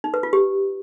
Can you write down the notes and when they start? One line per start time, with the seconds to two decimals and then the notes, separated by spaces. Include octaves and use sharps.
0.04 D#4
0.14 B4
0.23 F4
0.33 G4